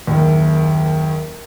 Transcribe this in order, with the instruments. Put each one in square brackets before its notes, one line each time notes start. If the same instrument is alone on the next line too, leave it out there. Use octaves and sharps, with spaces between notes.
[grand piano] F#1 D#2